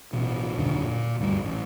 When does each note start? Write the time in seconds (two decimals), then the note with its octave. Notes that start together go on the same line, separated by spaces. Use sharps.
0.13 A1 B2
0.58 D#1 F#2 D3
0.83 A#2
1.19 D2 G2 G3
1.44 A1